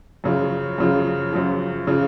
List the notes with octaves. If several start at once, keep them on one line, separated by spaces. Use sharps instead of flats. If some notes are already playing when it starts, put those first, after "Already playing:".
F#2 C#3 F3
F#2 C#3 F3
F#2 C#3 F3
C#3 F3